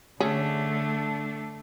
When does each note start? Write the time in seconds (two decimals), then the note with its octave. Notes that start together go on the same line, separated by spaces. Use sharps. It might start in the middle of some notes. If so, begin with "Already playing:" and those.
0.20 D3 A3 C#4 D4 G#4